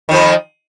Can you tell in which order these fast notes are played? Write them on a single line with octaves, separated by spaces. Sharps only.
D#3 F2 F3